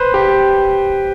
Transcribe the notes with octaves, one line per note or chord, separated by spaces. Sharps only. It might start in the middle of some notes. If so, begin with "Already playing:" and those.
Already playing: B4 C5
G4